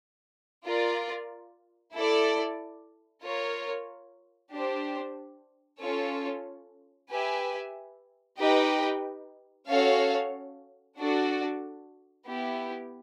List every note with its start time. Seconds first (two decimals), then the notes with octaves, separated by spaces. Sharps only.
0.65 F4 A#4 D5
1.94 E4 A4 D5
3.23 F4 A#4 C#5
4.52 D4 G4 C5
5.82 C#4 F4 A4 C#5
7.11 G4 B4 E5 G#5
8.40 D#4 G4 B4 D#5 G5
9.69 C#4 F#4 A4 C#5 F5
10.98 D4 F#4 A4 D5
12.27 B3 E4 G4